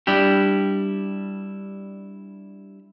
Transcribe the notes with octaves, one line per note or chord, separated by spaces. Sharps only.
G3 D4 E4 G4